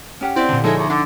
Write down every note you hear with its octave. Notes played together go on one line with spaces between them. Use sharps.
C#4 G4 F#5 F6
C4 E4 D5
A#2 D3
F3 G#3 D#4 G#4 A4 C#5 E5
D#2
D3 D4 F#5